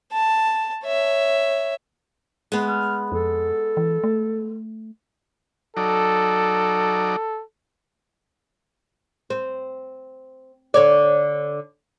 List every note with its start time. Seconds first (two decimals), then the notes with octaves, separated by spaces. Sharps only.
0.12 A5
0.84 C#5 E5
2.52 G#3 B3
2.68 F6
3.12 F2 A4
3.77 E3
4.04 A3
5.77 F#3 D#4 A4 D5
9.30 C4
10.74 D3 C#5 D5